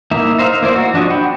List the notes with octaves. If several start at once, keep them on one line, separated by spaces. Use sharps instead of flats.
A#3 D#4 E4 E5
D#4 C5 E5 F5
A#3 E4 C5 D5
F#4
F3 D4 F#4 D#5
F#5 G5 B5